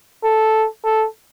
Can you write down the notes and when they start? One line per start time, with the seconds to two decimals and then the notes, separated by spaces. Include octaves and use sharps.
0.24 A4
0.84 A4